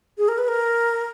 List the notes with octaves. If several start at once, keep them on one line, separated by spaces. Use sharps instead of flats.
G#4
A#4
B4
A#4